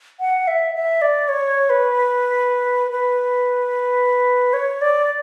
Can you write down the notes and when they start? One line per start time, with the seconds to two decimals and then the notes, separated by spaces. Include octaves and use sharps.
0.20 F#5
0.48 E5
0.75 E5
1.02 D5
1.29 C#5
1.70 B4
2.91 B4
4.53 C#5
4.81 D5